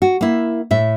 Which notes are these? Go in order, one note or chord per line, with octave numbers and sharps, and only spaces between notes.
F#4
A#3 E4
A2 E5